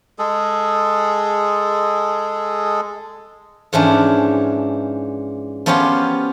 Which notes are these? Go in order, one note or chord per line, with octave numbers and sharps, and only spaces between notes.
G#3 G#4 A4
G#2 E3 F3 C#4 D4
F3 B3 C#4 F4 G4 C#5